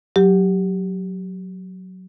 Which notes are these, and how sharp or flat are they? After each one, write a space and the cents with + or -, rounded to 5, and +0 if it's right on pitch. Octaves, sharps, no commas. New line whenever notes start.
F#3 +0 G4 +0